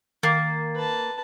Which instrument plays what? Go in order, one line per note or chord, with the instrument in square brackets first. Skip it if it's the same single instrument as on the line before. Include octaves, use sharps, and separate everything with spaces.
[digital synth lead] D#3 [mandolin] A#3 [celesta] A6 C7
[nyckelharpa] B4 A5